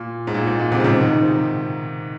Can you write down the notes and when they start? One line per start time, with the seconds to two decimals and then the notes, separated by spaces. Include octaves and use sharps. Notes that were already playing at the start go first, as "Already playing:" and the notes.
Already playing: A#2
0.27 G#2
0.34 A#2
0.47 G#2
0.59 A#2
0.72 G#2 C3
0.80 C#3
0.84 G#2 C3
1.01 C3 D#3